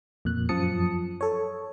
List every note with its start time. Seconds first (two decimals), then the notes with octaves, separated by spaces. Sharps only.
0.25 F2 A#2 F#6
0.49 F#2 F3 A5 D#6 C#7
1.21 A4 C#5